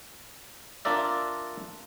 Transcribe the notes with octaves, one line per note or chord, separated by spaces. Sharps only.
D4 F4 A#4 D5 E5